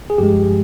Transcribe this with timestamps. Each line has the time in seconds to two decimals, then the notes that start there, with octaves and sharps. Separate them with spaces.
0.10 G#4
0.18 G2 F3 G#3 G4